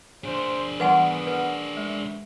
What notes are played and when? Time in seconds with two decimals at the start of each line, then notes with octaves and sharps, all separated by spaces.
0.24 D4 G#4 C5
0.80 E3 G3 B3 B4 F#5 G#5 C6
1.27 B4
1.77 G#3 E5